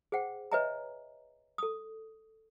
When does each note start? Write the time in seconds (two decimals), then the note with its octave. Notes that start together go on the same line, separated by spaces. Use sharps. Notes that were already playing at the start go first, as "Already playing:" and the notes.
0.12 G#4 C5 F#5 G5
0.52 B4 C#5 D#5 E5 G#5 A#5
1.58 A4 D#6